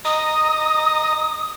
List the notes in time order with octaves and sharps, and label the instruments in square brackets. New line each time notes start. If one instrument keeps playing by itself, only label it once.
[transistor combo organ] D#5 A#5 [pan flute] D#6